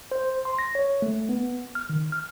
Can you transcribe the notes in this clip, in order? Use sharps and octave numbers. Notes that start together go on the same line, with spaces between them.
C5
C6
A#6
C#5
A3
B3
F6
D#3
F6